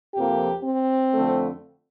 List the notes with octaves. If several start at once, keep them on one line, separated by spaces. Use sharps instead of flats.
F2 C3 F3 A#3 G4
C4
F2 D3 A3